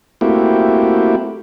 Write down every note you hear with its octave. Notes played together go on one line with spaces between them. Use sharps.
A3 A#3 C4 E4 F#4 G4